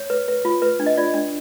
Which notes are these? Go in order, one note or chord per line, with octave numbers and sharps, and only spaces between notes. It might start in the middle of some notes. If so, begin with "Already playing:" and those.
Already playing: C#5
B4
B4
F4
B4
D4
D#5
F4 D5
D4